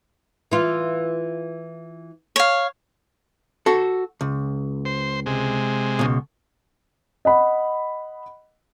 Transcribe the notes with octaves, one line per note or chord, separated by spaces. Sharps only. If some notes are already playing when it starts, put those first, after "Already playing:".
E3 F4
C#5 F5
F#4 A4
C#2
C5
C3 G#3
C#2 B2
D#5 F#5 B5